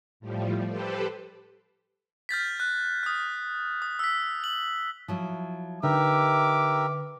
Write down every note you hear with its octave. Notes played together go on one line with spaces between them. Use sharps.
A2 F3 G3
G4 A4 B4 C5
F6 G6 A6 B6
F#6
D#6 F6
D#6
E6 B6
F#7
F3 F#3 E4
D3 D#4 G4 A#4 B4 E5 D6